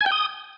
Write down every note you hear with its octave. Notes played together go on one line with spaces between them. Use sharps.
G#5
G5
D#6